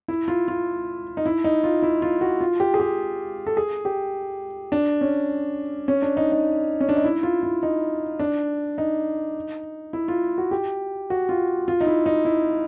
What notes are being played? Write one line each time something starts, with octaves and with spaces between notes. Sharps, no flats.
E4
F4
F4
D#4
E4
D#4
F4
E4
F4
F#4
F4
G4
G#4
G4
A4
G#4
G4
D4
C#4
C#4
D4
D#4
D#4
C#4
D4
D#4
E4
F4
E4
D#4
D4
D#4
E4
F4
F#4
G4
F#4
F4
F4
D#4
E4
D#4
E4